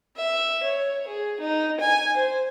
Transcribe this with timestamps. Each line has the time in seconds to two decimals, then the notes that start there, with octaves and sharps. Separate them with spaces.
0.17 E5
0.64 C#5
1.07 G#4
1.40 D#4
1.80 G#5
2.16 C5